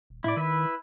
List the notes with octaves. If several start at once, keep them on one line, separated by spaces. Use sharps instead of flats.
D#1
A2 E4 D5
D#3 E4 B4 E5